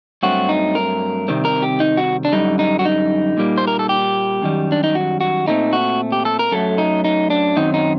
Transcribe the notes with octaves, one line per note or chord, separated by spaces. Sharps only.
G2 F#3 A3 C4 F#4
D#4
A#4
C3 D#3 G3 C4
A#4
G4
D#4
F#4
D4
F#2 D3 G3 D#4
D#4
F#4
D#4
A#2 G3 A#3
C5
A#4
A4
G4
F#2 D#3 G3
D4
D#4
F#4
F#4
A#2 A3 C4 D#4
F#4
G4
A4
A#4
F#2 F#3 A3 A4
D#4
D#4
D4
F#2 D#3 F#3 C4 D#4
D#4